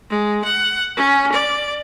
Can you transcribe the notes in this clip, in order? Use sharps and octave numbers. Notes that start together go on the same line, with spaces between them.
G#3
F#5
C#4
D5